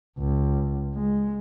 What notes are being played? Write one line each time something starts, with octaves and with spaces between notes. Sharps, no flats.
C#2
G#3